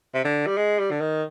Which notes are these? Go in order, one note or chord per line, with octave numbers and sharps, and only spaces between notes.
C3
D3
G3
G#3
G3
D3
D#3